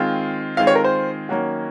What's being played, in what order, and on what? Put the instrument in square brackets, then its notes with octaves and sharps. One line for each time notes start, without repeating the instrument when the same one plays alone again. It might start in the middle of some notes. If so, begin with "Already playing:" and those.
Already playing: [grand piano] D#3 G#3 C4 F4
[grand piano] D#3 G#3 C4 F4 [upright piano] F5
[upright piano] C#5
A#4
C5
[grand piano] D#3 F#3 A#3 C#4 F#4